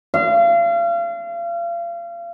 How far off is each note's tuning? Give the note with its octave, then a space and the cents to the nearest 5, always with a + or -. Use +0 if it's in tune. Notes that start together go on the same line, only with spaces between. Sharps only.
F5 -35